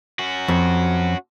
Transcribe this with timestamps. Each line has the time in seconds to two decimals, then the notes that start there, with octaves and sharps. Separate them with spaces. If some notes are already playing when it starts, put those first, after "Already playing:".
0.19 C#4 F#4
0.48 F2